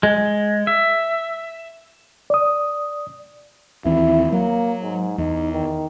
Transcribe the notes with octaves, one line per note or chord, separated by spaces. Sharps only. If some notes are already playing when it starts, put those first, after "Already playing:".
G#3
E5
D5 D#6
D#2 E3 C4 E4
F#3 A#3
G#2
E2 D#4
D#3